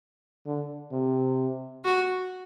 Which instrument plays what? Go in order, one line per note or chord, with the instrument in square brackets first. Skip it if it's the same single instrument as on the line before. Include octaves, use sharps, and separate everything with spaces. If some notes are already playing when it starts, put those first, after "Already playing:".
[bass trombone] D3
C3
[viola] F#4